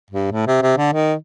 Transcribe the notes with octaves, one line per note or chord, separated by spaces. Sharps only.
G2
A2
C3
C3
D3
D#3